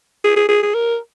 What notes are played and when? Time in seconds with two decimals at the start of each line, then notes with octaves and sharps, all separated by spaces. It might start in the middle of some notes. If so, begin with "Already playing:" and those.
0.24 G#4
0.36 G#4
0.49 G#4
0.63 G#4
0.74 A#4